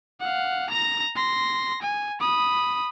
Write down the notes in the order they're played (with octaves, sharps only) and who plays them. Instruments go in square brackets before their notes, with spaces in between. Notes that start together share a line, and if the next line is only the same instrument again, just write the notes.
[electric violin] F5 F#5
A#5 A#6
C6 A#6
G#5
B5 D#6